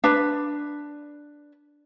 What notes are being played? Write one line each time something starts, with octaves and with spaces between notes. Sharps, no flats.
D4 B4